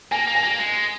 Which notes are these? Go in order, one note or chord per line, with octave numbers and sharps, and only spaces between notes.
A#3 G#5
A#3
G#5
A#3
G#3